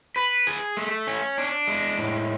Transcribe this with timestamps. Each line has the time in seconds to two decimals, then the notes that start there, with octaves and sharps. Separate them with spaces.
0.16 B4
0.47 G#4
0.77 A3
1.07 C#4
1.38 D4
1.68 G#3
1.98 A2